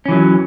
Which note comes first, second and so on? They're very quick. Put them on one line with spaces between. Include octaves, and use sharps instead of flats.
C#4 E3 F#3